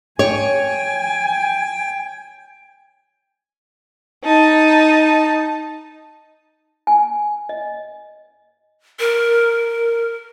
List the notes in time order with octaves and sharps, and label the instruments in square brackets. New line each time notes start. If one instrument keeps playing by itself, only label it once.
[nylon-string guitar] C#5 [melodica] G5 [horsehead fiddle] G#5
[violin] D#4 A5
[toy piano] G#5
D#5
[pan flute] A#4